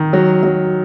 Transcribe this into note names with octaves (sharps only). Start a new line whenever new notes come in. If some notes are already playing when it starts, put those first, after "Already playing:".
Already playing: D#3
F#3
F#3